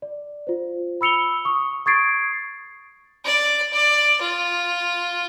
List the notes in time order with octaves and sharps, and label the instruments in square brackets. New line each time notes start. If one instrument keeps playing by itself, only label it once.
[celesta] D5
F4 C5
B5 E6 C#7 F7 G7
C#6 D#6
C#6 D#6 G#6 A6 C7 D7
[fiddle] D5
D5
F4